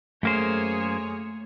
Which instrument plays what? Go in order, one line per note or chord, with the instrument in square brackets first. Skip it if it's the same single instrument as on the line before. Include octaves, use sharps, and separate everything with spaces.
[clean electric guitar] F#2 A#3 C5 [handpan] A3 [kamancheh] G#4 C#5